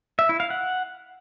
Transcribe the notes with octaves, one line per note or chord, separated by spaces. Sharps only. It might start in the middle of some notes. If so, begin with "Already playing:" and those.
E5
E4
F5
F#5